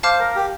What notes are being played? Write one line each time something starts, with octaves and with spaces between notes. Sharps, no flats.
C5 F5 A5 D6 F6
A#4
G4